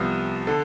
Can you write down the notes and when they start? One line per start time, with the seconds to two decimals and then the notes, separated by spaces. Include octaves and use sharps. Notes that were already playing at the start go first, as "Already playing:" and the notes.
Already playing: C2 C3 F3 B3
0.47 D3 A4